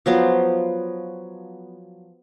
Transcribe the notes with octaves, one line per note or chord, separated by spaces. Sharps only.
F3 F#3 B3 C5